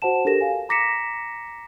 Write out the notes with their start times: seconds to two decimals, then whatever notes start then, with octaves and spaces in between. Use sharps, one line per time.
0.02 F#4 C5 F#5 A5 E7
0.25 D4 G4 A4 A#4 A#6 E7
0.41 F5 G#5
0.69 A#5 D6 A#6 B6 C#7 E7